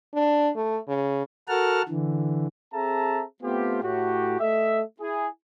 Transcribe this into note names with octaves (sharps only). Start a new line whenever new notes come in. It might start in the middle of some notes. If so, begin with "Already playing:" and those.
D4
A3
C#3
F#4 A4 A#4 F#5 A5 F6
D3 E3
C4 G#4 A4 E5 A5 A#5
A3 B3 C4 F4 G4
A2 F#4 G4
A3 A4 D#5 E5
E4 G#4